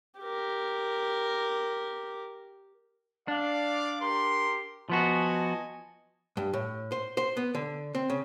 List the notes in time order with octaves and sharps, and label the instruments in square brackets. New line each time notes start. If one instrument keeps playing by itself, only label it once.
[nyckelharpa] G4 A#4
[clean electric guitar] D4 [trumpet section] D5 F5 D6
[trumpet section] G4 A#4 C6
[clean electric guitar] F3 B3 F#4 [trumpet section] D#5 G#5 A5
[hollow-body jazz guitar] G2
A2
C5
C5
B3
D3
C4
C#3